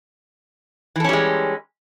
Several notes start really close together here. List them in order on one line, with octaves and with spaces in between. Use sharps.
E3 A4 C#4 G3 G#3